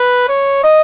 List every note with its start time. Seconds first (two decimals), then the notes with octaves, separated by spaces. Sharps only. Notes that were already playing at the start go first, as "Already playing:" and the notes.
Already playing: B4
0.29 C#5
0.64 D#5